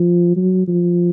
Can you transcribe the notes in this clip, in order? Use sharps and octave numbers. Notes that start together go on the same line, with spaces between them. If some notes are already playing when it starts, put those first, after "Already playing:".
Already playing: F3
F#3
F3